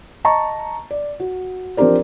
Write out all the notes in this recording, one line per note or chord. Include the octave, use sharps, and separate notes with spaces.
D#5 A5 A#5 C#6
D5
F#4
F3 C4 D4 G4 A#4 D5